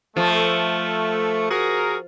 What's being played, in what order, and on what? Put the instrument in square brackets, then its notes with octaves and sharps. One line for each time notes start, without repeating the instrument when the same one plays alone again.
[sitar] F3 [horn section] A3
[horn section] F#4 G#4 A#4